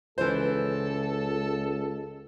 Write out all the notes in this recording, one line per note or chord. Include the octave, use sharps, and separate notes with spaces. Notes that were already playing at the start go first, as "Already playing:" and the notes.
C#2 E3 A4 C5